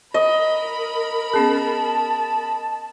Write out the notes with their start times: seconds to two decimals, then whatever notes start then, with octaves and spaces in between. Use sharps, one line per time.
0.14 A#4 D#5 B5
1.34 B3 C#4 G#4 A5